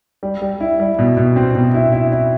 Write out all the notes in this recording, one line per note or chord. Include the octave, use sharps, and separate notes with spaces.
G3
G3
E4
G3
B2
B2
C4
B2
E4
E4
E4